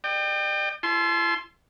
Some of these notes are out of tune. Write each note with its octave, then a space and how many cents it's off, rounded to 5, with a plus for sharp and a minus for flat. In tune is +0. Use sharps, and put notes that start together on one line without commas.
D5 +45 G5 +0
E4 +40 A5 -40 C6 +0